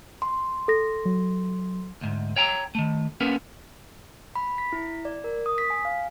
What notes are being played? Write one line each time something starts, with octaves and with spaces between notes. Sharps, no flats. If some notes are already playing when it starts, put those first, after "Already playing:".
C6
A4 A#6
F#3
D2 G#2
C#5 G5 A#5
D#3 A3
A#3 B3 C#4 A#4 B4
B5
B6
E4
D5
A#4
D#6
B6
G#5
F5